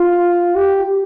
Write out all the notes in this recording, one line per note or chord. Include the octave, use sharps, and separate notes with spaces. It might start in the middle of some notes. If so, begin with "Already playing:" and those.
Already playing: F4
G4